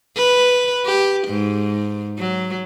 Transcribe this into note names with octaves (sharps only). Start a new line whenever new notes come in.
B4
G4
G#2
F#3